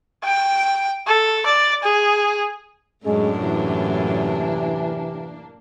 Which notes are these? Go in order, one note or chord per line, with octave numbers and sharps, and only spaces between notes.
G5
A4
D5
G#4
F#2 A2 G#3 A#3 C#4 D4
C3 E3